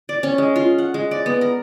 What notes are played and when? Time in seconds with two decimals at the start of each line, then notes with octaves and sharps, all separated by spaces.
0.09 D5
0.23 C#4
0.38 G#3
0.56 F4
0.78 F#5
0.94 G#3
1.11 D5
1.26 B3
1.41 A#4